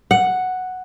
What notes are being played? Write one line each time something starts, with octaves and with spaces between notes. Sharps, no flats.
F#5